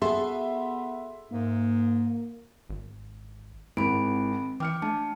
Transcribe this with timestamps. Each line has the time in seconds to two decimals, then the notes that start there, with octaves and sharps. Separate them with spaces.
0.02 B3 F#4 G#4 A4 E5 C6
1.31 G#2 A#3
2.70 G#1
3.77 G#1 C4 E4 B5 D7
4.60 E3 G5 D6 F6 C#7
4.82 A3 D4 A5